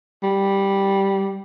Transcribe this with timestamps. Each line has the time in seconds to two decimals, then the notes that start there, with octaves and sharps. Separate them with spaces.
0.23 G3